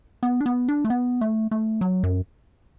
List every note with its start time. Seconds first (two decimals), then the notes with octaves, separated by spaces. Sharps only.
0.23 B3
0.40 D4
0.46 B3
0.68 D4
0.85 A3
0.90 B3
1.21 A3
1.51 A3
1.81 F#3
2.03 F#2